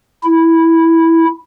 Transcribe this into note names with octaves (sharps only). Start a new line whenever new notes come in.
E4